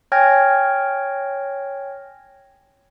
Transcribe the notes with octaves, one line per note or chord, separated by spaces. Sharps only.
C#5 G5 G#5 F6 G#6 A#6